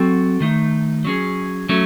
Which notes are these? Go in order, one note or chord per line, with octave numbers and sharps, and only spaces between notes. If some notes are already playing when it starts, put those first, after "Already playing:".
Already playing: F#3 C4 F#4 A4
D#3 A3 D#4
F#3 C#4 G#4
F#3 A3 C#4